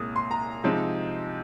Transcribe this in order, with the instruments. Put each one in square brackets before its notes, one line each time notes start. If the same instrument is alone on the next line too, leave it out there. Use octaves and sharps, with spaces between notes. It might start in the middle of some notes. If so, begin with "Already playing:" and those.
Already playing: [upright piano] C2 A#2 G#3 D#6
C6
A#5
C3 F3 G#3 C4 D#4